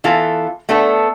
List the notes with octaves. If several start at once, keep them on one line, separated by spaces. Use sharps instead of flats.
E3 B3 F4 A4
A3 B3 D4 A4